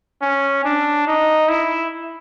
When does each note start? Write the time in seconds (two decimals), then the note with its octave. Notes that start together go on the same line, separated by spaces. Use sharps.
0.21 C#4
0.64 D4
1.07 D#4
1.49 E4